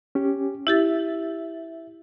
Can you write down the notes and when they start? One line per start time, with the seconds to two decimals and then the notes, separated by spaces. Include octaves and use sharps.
0.15 C#4 G4
0.67 E4 G4 E5 A6